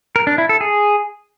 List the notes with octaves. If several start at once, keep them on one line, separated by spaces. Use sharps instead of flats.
A#4
D4
E4
A4
G#4